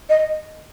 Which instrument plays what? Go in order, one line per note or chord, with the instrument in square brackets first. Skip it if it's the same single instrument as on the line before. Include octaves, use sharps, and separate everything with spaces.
[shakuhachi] D#5